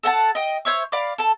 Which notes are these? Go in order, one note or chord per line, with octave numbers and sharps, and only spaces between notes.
A4 F#5 G5 A5
D#5 G5
C5 C#5 E5 C#6
D5 F5 B5 D6
A4 A5